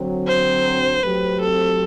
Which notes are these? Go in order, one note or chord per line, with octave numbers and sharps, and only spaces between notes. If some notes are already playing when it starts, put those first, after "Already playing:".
Already playing: D3 F#3 C4
C5
F#3 A3 C4 G4 B4
A4